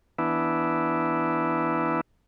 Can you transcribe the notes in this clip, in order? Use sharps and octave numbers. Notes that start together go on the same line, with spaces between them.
E3 B3 D4 E4